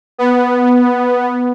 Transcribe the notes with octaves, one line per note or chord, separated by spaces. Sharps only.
B3